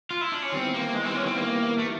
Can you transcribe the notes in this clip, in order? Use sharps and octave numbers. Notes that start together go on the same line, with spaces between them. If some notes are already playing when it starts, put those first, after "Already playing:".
F4
E4
D4
C#4
D#3 G3 B3 C4 E4
A#3
G#3
C4
C#4
C4
A#3
A3